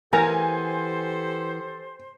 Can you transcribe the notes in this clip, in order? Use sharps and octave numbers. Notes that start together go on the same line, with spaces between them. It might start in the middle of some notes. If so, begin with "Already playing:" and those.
E3 B3 G4 A4 A#4 C5 G#5 A#5